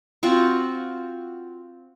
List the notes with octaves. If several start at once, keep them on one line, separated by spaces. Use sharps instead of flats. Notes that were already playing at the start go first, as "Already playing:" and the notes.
C4 F4 F#4 C#6